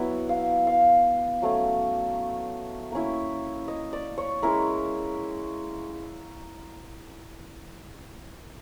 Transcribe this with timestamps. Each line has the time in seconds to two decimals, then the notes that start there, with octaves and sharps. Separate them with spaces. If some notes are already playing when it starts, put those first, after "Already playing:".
Already playing: F#3 B3 E4 F#5
0.29 F5
0.67 F5
1.42 F#3 A3 C#4
2.92 A#3 C#4 E4
3.68 D#5
3.93 D5
4.18 C#5
4.42 G#3 C#4 E4 A#4